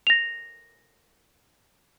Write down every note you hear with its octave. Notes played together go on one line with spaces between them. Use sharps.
A#6 F7